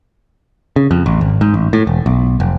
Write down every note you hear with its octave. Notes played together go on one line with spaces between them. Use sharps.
C#3
F2
A1
G#1
G#2
A1
A2
E1
B1
F1